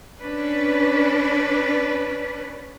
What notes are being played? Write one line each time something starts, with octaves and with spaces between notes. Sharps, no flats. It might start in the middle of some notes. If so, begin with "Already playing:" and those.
C#4 D4 B4